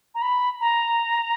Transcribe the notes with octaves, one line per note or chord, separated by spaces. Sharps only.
A#5
B5
A#5